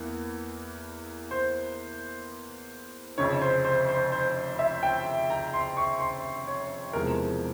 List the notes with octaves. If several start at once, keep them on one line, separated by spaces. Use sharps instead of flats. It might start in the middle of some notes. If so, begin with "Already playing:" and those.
Already playing: E2 E3 A#3
C5
F1 F2 C#3 C#5
C5
C5
C5
C5
E5
G5
A#5
C6
C#6
C6
C#5
E1 E2 C3 F3 G#3 A#4